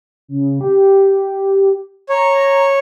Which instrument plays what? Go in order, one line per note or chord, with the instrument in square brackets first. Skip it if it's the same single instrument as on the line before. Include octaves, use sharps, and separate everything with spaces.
[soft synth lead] C#3
G4
[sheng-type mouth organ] C#5 [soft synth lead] A#5